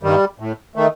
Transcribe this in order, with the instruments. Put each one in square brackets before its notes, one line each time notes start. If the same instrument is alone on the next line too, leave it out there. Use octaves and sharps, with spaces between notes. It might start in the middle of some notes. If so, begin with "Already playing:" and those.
[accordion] G2 D#3 G3
A2
D#3 A3